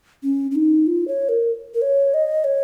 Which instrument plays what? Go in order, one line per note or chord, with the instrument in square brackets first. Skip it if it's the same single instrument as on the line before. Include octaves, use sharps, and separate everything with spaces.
[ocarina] C#4
C#4
D#4
F4
C#5
A#4
A#4
C#5
D#5
C#5